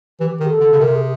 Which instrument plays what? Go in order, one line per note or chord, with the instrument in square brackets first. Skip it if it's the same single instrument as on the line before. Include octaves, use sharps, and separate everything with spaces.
[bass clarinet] E3 [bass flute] G4
[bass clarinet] D#3
[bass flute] G#4
A4
[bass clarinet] D3
C#3
[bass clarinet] C3 [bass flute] A#4
[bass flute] G#4